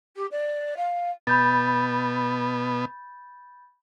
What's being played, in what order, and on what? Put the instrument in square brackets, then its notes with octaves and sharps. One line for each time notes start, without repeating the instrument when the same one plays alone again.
[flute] G4
D5
F5
[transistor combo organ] B2 B3 [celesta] B5 G6 A6